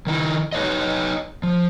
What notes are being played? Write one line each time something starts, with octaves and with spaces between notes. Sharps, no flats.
D#3 D#4 E4
D#4 B4 C#5 D#5
F3